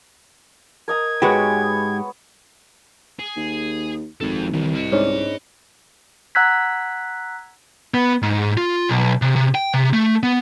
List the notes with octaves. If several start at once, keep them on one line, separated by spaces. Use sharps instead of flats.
A#4 D#5 A#5 G#6
G#2 B2 G#3 B3 F#4 G4 C#5
G#4
D#2
G#1 F3 A4
C2 D#3 E3
D#5 B5
G#2 C#4 D4
F#5 A#5 E6 F#6 G#6 B6
B3
G#2
F4
B1
C3
C3
G5
C3
A3
B3